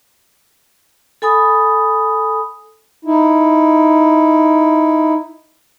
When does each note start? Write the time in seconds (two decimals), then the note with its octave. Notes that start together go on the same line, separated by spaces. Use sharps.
1.22 A4 G#5 B5 D#6
3.05 D#4 E4